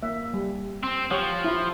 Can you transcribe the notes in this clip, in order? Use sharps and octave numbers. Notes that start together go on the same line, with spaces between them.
A#3 E5
G3
C4
F3 G4 C#5 F#5
E4 F4